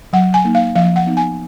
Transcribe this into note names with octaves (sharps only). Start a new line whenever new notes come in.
F#3 F#5
G#5
A#3 D#4
F5
F3 F5
F#5
B3 D#4
G#5